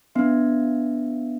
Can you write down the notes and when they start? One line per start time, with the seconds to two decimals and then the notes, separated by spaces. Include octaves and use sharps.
0.15 B3 D4 E5